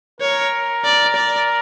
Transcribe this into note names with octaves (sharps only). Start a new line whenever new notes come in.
A#4 C#5
D5
D5